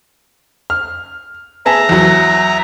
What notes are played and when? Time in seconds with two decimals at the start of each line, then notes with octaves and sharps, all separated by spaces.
0.70 F6
1.66 B3 G#4 E5 A5 A#5
1.89 E2 F#3